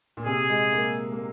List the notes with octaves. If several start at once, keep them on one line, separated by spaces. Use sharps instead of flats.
A#2
C3 G#4
G#3
A#3
A#3